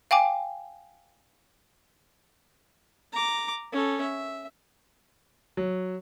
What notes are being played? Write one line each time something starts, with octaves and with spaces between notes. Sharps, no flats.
F5 G5 G#5 D6
A#5 D6
C#4 A4
E5
F#3